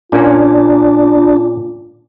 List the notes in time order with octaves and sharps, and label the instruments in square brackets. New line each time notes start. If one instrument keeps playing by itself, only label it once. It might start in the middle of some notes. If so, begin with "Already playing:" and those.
[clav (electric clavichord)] A#2 A#3 C#4 [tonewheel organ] D4 [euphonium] F4